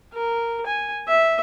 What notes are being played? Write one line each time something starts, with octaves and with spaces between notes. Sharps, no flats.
A#4
G#5
E5